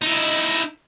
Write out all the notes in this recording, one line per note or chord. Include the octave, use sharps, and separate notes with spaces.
D#4 E4